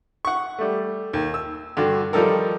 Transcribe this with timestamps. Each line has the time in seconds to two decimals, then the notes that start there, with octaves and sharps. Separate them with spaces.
0.25 F#5 C#6
0.59 G3 A3
1.13 D#2
1.34 E6
1.77 G2 D3 F#4
2.13 D#3 F3 G3 D#4 A4 A#4